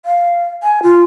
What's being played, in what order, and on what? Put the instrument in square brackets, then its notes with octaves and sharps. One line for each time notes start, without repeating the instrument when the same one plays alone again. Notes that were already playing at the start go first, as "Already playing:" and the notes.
[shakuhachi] F5
G#5
F4